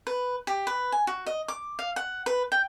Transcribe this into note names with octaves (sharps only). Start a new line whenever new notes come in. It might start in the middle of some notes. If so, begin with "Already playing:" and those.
B4
G4
B4
G#5
F#4
D#5
D6
F5
F#5
B4
G5